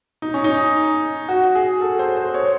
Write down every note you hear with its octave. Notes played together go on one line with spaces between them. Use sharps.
D#4
C#4
D#4
F#4
G#4
A4
C5
C5
C#5